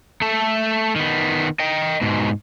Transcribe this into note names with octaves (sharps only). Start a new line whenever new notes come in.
A3 A4
D#3 B3
D#5 G5
G#2 B2